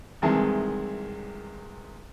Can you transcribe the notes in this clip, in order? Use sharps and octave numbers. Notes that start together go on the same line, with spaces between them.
C2 C3 D#3 E3 G#3 A5